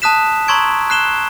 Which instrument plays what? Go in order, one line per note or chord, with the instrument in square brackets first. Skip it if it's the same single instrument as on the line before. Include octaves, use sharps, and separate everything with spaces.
[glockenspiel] A5 D#6 F#6 B6 E7
A#5 C6 C#6 E6 G#6 D7
F#6 C7 E7 G7